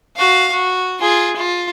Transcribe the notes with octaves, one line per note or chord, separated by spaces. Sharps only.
F#4 F5
F#4
F4 G#4
F4